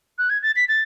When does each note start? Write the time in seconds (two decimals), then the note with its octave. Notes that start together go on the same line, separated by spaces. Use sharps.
0.18 F#6
0.30 G#6
0.43 A6
0.56 B6
0.69 A6